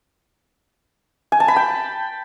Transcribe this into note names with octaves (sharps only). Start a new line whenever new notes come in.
G#5
A5
B5
G5